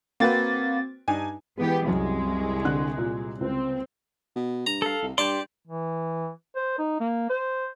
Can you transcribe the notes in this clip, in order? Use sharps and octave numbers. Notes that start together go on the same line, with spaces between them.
A#3 C4 F#4 B4 A6
G2 D4 D#4 G#5
E3 G#3 B3 G4
C2 F#2 G#3
D3 F#6
A#2
C#2 C4
B2
G2 A#5
A4 F5
C2
G2 G4 D5 A5 C6
E3
C5
D#4
A#3
C5